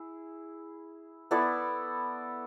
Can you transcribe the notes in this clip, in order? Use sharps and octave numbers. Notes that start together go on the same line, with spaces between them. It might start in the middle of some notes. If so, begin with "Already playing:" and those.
Already playing: E4 G#4
B3 E4 A4 D5